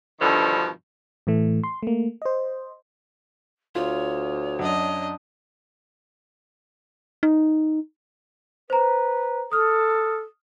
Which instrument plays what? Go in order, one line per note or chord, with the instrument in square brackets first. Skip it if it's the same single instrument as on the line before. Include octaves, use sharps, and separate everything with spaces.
[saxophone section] G2 B2 D3 D#3 F3
[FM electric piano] A2 E3 A3
C6
A3 A#3
C5 D#5
[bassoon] D2 [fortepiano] F4 [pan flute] C#5
[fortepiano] F#2 [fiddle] D4 D#5
[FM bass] D#4
[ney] B4 [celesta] C5 A#5
[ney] A4 [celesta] D#6 F6